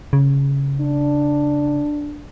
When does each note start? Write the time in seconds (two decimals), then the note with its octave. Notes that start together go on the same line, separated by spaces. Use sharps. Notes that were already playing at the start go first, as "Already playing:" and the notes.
0.13 C#3
0.80 D4